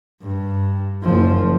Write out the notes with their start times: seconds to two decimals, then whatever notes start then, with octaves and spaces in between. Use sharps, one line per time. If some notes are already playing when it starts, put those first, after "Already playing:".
0.22 G2
1.02 F#1 F3